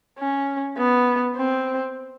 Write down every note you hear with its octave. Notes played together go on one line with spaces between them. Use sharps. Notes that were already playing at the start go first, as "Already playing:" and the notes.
C#4
B3
C4